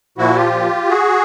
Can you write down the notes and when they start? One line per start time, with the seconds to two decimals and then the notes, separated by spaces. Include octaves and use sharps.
0.18 A#2 F3 E4 F#4
0.36 F4 G4
0.89 F#4 G#4